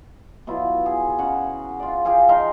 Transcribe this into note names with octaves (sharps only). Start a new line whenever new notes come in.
B2 F#3 E4 F4
G#4
C#3 F#4 F#5
F4 D5
G4 G#4 F5 G#5
F3 D#4 F5 C6